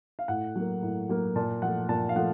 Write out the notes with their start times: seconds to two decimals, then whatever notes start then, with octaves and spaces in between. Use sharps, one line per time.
0.19 F5
0.28 A2 F#5
0.56 F#3 A#3
0.82 A2
1.09 F#3 A#3
1.36 A#2 A5
1.62 F3 A3 F#5
1.89 A#2 A5
2.09 F5
2.16 F3 A3 F#5